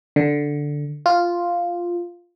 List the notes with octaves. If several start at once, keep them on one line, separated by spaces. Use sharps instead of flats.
D3
F4